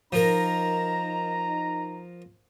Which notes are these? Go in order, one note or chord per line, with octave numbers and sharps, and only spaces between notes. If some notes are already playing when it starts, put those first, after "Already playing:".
F3 D#4 A#4 A#5